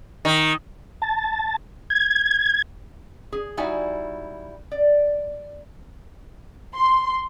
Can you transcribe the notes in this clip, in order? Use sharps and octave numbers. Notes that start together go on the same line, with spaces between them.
D#3
A5
G#6
G#4
G3 D#4 E4 F#4 G#5
D5
C6